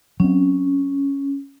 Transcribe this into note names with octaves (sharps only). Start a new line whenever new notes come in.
F#3 C4 C#4